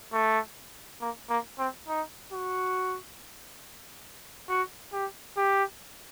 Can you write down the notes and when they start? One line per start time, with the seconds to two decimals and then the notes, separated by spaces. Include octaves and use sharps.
0.13 A3
1.01 A#3
1.30 A#3
1.59 C4
1.88 D#4
2.32 F#4
4.49 F#4
4.93 G4
5.37 G4